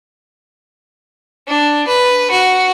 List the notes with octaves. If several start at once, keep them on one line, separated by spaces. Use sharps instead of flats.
D4
B4
F#4